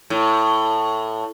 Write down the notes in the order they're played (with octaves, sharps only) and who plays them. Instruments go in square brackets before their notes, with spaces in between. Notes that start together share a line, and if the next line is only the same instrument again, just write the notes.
[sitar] A2